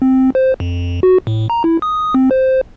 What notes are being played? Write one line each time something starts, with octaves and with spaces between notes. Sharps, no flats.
C4
C5
F2
F#4
A2
A#5
E4
D#6
C4
C5